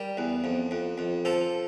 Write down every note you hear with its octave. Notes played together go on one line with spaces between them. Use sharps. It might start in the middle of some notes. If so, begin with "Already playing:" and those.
Already playing: G3 A#4
E2
F2
F2
F2
F3 A4